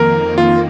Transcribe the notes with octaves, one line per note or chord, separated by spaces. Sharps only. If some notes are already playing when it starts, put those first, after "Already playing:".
Already playing: F2 D#3 A#3 A#4
F4